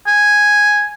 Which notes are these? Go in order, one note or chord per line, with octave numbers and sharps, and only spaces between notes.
G#5